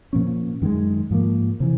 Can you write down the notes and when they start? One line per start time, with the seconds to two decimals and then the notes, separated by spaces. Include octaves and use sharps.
0.13 A#2 F3 A#3 C#4
0.62 F#2 D#3 G#3
1.10 G#2 F3 A#3
1.60 C3 E3